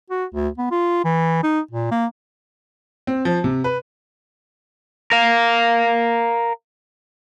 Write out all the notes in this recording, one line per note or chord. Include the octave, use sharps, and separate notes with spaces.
F#4
D2
B3
F4
E3
D#4
A#2
A#3
C4
F3
C3
B4
A#4 F5